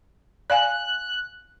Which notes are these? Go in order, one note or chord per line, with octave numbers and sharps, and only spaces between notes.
D5 F5 G#5 F#6